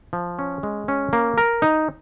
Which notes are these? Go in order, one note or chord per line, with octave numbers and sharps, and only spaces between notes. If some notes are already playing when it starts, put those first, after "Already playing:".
F3
C#4
G#3
C#4
A#3
A#4
D#4